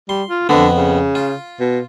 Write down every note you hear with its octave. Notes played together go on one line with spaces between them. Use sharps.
G3 C6
F4
F2 D3 F3 B3
C#3
F4
B2